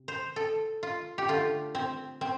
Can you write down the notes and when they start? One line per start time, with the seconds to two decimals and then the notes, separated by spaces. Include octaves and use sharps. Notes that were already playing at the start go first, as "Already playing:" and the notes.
Already playing: C3
0.08 C5
0.36 A4
0.83 F4
1.18 G4
1.28 D3 A3 F4
1.75 C4
2.21 C4